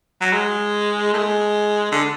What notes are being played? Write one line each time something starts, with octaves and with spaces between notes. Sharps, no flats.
F#3
G#3
A3
G#3
D3